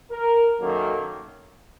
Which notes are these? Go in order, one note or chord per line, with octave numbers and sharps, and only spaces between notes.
A#4
F#2 D#3 F#3 A#3 A4